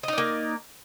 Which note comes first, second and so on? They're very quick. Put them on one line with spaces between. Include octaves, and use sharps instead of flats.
D#5 D#4 D5 A#3